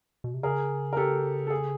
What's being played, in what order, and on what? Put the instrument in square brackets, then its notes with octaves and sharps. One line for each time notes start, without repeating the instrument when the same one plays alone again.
[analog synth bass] B2
C3
[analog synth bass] C#3 [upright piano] G#4 A#4
[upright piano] A#4
G4 A4
A4
G#4